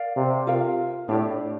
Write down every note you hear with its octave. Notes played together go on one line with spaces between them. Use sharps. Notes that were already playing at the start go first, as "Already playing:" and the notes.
Already playing: A#4 D5 F5
C3
F4 A#4 F5
A2 D4 G4 D5